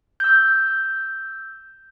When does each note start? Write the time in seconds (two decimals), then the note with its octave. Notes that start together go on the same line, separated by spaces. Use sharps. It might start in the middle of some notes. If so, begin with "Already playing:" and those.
0.20 E6 G6